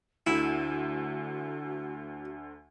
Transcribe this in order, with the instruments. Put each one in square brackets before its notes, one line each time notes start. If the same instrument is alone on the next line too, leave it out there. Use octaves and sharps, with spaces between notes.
[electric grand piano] D2 D3 [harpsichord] E4 [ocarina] F#4